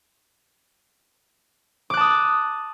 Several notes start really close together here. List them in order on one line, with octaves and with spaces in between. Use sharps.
D6 F#6 A5 D#6